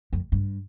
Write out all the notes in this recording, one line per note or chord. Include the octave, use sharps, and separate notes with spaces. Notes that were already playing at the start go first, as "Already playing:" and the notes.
F2
G2